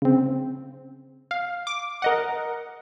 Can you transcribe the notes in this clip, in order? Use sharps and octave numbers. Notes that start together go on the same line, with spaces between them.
C#3 C4
F5
D6
A#4 D#5 F#5